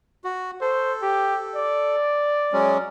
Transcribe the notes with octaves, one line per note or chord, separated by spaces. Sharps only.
F#4
A4 C5
G4
D5
F#3 G#3 C#4